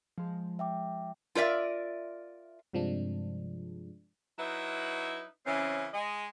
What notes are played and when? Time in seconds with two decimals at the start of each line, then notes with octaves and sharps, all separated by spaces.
0.18 F3 G#3
0.59 E5 G5 D6
1.35 F4 A#4 D5 E5
2.73 G2 C3 F3 G#3 D4
4.39 F#3 D#4 E4 B4 E5
5.45 C#3 E3 C4 C#4
5.93 G#3 D#5